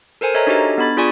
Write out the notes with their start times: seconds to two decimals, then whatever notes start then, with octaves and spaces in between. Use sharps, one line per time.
0.21 A4 A#4 C5 G#5
0.34 A4 C#5 D#5 E5 G#5 A#5
0.47 D4 D#4 F#4 G4 A4 D#5
0.78 B3 D4 B5 A6
0.97 F4 G#4 D5 G#5 C#6